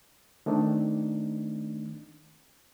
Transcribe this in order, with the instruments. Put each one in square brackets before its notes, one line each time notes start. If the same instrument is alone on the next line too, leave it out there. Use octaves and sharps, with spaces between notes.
[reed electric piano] D#3 A3 C4 D4 D#4